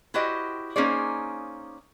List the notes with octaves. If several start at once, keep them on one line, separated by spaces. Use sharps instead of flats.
E4 F#4 G4 C5 D#5
A#3 C#4 D#4 G#4 C5 D5